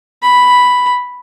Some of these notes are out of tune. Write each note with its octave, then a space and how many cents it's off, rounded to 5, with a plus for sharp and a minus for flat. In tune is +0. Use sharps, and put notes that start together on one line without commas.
B5 +0